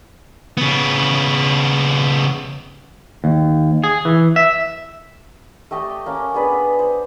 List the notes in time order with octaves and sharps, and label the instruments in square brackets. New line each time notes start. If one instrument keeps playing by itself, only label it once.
[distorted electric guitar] C#3 B3
[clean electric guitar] D#2
G#4
E3
E5
[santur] A3 G4 D#5 A5
A#3 C#4 D6
B3 D4 G#4 B4
C5